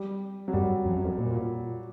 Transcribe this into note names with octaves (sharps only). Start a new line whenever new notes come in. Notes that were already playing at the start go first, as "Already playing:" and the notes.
Already playing: G3
F#3
F#2 G3
F2
F#2
F2
A#2